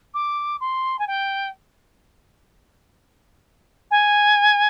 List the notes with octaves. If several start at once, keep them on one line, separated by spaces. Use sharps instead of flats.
D6
C6
G#5
G5
G#5